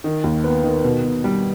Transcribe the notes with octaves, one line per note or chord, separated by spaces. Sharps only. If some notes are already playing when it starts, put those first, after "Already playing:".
D#3
D#2
B3
D#3
B2
B2
G3